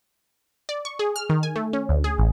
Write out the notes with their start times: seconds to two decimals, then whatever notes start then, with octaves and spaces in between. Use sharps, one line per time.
0.69 D5
0.85 C#6
0.99 G#4
1.16 F6
1.29 D#3
1.43 G#5
1.56 A3
1.73 C#4
1.89 D2
2.04 G#4
2.18 A1